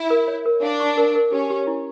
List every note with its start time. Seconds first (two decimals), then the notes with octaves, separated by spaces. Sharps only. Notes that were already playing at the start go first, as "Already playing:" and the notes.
Already playing: E4
0.10 A#4
0.28 C#5
0.46 A#4
0.63 D4 F5
0.80 C#6
0.97 A#4
1.15 A#4
1.32 C#4 G4
1.50 G4
1.67 E4